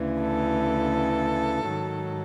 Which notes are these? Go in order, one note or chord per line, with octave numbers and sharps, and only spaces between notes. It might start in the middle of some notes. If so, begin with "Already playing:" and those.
Already playing: D2 C#3 E3
A4
G#2 D#3 F#3